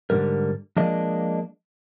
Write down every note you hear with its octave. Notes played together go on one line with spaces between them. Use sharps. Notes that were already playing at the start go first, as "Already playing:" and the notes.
G#2 D3 D#3 G3 A#4
F3 G#3 A#3 D4 D#5